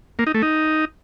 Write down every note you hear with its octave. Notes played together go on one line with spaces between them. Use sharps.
A#3
D#4
A3
D#4